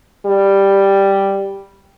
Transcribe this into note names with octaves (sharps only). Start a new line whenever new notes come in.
G3